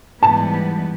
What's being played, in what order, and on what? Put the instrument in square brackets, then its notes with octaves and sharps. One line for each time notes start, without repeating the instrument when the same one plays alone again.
[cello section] G#2 E3 G3 B3 [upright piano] A5